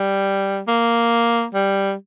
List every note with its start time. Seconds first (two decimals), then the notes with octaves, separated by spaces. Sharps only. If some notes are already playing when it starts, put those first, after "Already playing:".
Already playing: G3
0.68 A#3
1.54 G3